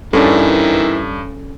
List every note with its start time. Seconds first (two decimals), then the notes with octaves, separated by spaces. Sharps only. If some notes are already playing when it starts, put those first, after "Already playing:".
0.13 G2 D#3 E3 C#4 A4 D5